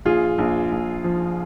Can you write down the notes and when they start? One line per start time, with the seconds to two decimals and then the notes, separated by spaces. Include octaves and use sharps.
0.05 A#1 F4 G#4
0.38 A#1
0.72 A#1
1.04 F3